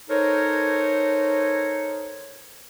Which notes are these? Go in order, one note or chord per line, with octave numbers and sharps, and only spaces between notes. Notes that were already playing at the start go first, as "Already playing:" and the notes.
D#4 A4 A#4 C5 C#5